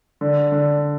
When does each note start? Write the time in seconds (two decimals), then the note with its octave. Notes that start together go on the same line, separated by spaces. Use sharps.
0.21 D3
0.52 D3